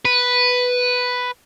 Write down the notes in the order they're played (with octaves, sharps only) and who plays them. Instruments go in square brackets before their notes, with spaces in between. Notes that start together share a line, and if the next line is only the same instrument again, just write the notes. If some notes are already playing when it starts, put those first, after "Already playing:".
[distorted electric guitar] B4